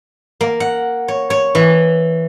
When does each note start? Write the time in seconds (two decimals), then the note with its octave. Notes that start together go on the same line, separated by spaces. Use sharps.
0.41 A#3
0.60 F#5
1.08 C#5
1.30 C#5
1.55 E3